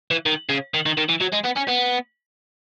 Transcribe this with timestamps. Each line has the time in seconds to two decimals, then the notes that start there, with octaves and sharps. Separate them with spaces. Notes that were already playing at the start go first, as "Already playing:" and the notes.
0.11 E3
0.26 D#3
0.49 C#3
0.74 D#3
0.86 D#3
0.98 D#3
1.09 E3
1.21 F#3
1.33 G#3
1.45 B3
1.57 C#4
1.69 B3